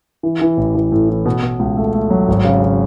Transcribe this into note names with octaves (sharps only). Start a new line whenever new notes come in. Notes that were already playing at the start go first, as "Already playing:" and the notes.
E3
E3
A1
E3
A2
E3
B2
B2
C#2
A3
A3
F#3
G#1
C#3
C#3